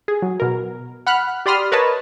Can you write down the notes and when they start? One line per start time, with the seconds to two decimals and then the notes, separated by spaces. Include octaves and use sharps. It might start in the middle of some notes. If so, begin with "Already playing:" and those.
0.08 G#4
0.22 F#3
0.40 B2 A#4
1.07 F#5 B5 F6 F#6
1.46 G4 D5 B5 C6 D#6 F6
1.72 A#4 B4 C#5 D#5 A5